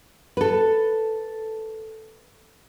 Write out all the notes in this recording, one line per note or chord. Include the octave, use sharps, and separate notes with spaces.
A4 B4